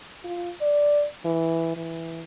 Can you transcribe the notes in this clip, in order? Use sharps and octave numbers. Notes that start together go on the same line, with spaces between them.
F4
D5
E3
E3